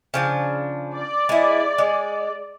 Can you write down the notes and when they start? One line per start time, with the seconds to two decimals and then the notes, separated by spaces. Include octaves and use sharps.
0.14 C#3 F3 D4
0.94 D5
1.29 G#3 E4
1.78 G#3